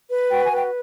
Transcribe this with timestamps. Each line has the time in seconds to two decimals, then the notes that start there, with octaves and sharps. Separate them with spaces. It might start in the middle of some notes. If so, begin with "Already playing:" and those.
0.09 B4
0.30 F#4 G5
0.43 G#5
0.51 B4
0.56 G5